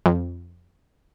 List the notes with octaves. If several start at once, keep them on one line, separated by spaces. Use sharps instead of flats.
F2